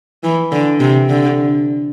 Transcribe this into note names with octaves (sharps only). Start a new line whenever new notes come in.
E3
D3
C3
D3